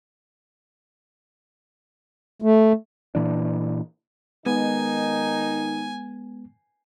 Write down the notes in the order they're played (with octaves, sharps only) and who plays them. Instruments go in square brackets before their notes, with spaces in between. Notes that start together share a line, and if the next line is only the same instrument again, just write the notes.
[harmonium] A3
[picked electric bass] A#2 E3 D4
[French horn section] D#3 D#4 [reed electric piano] G#3 B3 [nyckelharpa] G#5